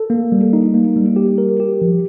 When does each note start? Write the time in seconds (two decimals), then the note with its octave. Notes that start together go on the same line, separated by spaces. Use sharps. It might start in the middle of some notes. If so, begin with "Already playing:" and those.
Already playing: A4
0.10 A#3
0.32 G3
0.53 D#4
0.74 A#3
0.96 G3
1.16 G4
1.38 A#4
1.60 G4
1.82 F3